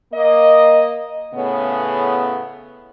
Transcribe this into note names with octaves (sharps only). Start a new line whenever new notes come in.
A#3 D#5
A2 C#3 B3